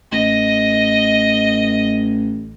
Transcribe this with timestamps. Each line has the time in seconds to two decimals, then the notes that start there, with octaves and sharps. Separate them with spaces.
0.12 A1 D#5